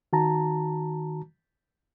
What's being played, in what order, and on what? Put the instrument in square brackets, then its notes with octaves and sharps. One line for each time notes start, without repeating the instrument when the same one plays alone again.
[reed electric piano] D#3 F#4 A5 A#5